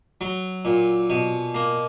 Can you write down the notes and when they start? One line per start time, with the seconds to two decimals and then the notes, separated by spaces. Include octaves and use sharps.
0.21 F#3
0.65 A#2
1.10 B2
1.55 A#3